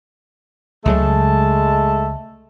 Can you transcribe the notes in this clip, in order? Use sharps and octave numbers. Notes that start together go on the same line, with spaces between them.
C#2 C#3 F#3 G#3 A3 A5